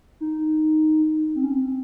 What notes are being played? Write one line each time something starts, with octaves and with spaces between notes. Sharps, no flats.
D#4
C4
C#4
C4